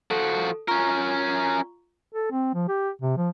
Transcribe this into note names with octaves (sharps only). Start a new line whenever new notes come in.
F3 F#4 A4
C#4 F4 A#4 A#5 C#6
A4
C4
F3
G4
C3
F3